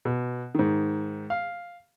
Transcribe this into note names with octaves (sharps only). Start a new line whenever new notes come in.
B2
G#2 D#3
F5